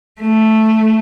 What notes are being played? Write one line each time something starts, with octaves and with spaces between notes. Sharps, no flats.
A3